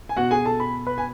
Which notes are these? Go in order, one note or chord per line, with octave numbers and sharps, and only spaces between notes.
G#5
B2 F#4 F#5
G#4 G#5
A4 A5
B5
B4 B5
G#5